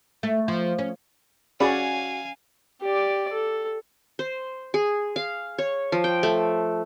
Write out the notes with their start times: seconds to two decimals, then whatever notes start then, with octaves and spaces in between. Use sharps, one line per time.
0.23 A3
0.48 F3
0.78 C#4
1.60 C#4 F#4 G#4 D5 F5 G#5 B5
2.82 G4 D5
3.33 A4
4.19 C5
4.74 G#4
5.16 F5
5.58 C#5
5.92 F3
6.04 G5
6.23 A3